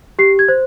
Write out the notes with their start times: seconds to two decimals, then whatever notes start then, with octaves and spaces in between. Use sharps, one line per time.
0.19 G4 C7
0.39 G#6
0.48 C5